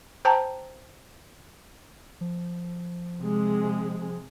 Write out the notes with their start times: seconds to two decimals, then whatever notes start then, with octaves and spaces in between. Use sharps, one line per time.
0.25 C5 G5 A5 A#5
2.21 F3
3.18 C3 G#3